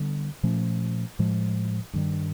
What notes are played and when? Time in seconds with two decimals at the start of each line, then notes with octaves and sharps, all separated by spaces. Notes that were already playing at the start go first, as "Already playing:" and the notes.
Already playing: D3 G3 B3 D4
0.43 A#2 F3 A3 C#4
1.19 A2 F3 G#3
1.93 G2 D#3 G3